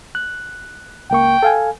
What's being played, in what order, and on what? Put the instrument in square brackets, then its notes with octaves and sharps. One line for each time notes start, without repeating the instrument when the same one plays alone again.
[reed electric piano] F#6
[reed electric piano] C#2 A#3 C#6 [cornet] G5
[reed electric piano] A4 F5 G#5